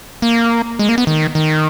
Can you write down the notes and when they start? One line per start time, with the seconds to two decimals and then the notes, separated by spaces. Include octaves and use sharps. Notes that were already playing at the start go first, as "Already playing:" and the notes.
0.22 A#3
0.79 G#3
0.89 A#3
0.98 B3
1.07 D#3
1.35 D#3